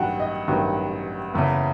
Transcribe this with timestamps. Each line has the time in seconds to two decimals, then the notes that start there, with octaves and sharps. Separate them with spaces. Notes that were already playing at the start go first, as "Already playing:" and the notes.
Already playing: A1 G2 D#3 F#3 F#5 G5
0.20 D#5
0.48 A1 G2 D#3 F#3
1.34 F#1 E2 C#3